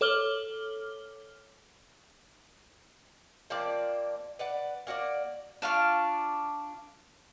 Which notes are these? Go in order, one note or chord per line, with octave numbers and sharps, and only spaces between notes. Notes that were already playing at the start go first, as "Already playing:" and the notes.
A4 C#5 D6 F6 F#7 G7
F3 A#3 C4 D5
B4 D5 F#5
A#3 F#4 G4 D5
D4 F4 F5 C#6